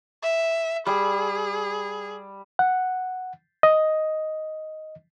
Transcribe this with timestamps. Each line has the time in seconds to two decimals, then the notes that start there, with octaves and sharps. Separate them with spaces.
0.22 E5
0.87 G3 G#4
2.59 F#5
3.63 D#5